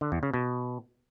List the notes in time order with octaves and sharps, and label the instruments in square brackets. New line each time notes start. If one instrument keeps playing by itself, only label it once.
[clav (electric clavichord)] D3
E2
C#3
B2